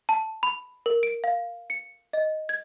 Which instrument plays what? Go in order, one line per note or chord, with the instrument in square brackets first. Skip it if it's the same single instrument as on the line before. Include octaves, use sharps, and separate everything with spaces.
[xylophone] A5
B5
A#4
D7
F5
C#7
D#5
G#6